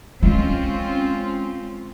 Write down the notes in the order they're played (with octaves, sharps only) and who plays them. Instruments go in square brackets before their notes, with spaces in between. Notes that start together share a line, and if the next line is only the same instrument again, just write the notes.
[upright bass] G#3 [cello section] C4 C#4 F4